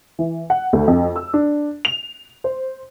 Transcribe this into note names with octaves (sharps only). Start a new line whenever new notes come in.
E3
F#5
D2
F2
E6
D4
F7
C5